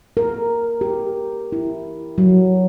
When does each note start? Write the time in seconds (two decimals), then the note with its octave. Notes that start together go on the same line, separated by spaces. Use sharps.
0.17 A#4
0.81 G4
1.52 E4
2.18 F#3